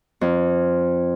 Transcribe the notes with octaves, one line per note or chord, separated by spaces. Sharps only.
F2